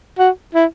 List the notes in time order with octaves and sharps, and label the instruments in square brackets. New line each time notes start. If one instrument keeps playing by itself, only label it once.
[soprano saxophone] F#4
E4